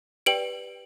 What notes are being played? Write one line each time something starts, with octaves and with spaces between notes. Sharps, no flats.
G4 B4 D5 G5 D7 F#7